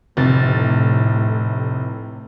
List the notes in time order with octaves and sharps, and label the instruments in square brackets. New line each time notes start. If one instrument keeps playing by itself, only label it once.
[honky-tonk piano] F1 C3 A6 [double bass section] A2